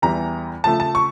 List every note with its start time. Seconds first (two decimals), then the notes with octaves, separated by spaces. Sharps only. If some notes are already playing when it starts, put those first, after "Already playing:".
0.02 E2 E3 G3 A#5
0.64 C#3 F3 A3 A5
0.80 A5
0.95 C#6